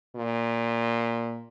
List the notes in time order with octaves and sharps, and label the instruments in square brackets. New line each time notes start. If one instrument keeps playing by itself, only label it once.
[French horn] A#2